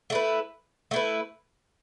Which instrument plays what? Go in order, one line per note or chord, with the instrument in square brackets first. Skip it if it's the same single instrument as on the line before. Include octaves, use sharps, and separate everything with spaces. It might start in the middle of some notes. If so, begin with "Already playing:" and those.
[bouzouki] A3 E4 B4
A3 E4 B4